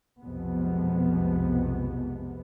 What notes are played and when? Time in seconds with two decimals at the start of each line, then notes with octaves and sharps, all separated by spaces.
0.21 B1 F2 C3 G#3 B3